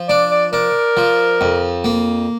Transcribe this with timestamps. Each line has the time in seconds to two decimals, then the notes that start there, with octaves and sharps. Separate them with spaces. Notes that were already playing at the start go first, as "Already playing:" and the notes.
Already playing: F3
0.09 D4 D5
0.31 D5
0.53 D4 A#4
0.97 F3
1.41 F2
1.84 A#3